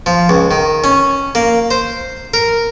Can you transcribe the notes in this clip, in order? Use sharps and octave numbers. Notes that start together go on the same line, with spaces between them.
F3
C#2
D#3
C#4
A#3
C5
A#4